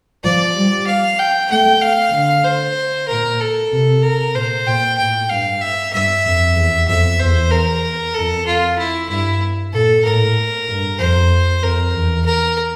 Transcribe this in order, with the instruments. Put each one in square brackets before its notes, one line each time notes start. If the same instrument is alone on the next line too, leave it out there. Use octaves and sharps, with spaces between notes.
[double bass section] F3 [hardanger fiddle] D5
[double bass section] G3
[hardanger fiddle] F5
G5
[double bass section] A3 [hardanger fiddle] G5
[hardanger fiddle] F5
[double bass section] D3
[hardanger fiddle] C5
[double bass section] A#2 [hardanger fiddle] A#4
[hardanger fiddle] A4
[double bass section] C3
[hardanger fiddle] A#4
[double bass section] A#2 [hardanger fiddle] C5
[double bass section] A#2 [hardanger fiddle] G5
[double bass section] A2 [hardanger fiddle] G5
[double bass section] G2 [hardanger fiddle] F5
[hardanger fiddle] E5
[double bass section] G2 [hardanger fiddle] E5
[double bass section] F2
E2
[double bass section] F2 [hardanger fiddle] E5
[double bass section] E2 [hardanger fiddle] C5
[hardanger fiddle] A#4
[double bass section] F2 [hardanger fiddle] A4
[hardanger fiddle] F4
E4
[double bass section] G2 [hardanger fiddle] E4
[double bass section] A#2 [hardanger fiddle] A4
[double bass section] A2 [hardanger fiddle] A#4
[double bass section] G2
[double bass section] F2 [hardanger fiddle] C5
[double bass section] F2 [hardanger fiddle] A#4
[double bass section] E2
[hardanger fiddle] A#4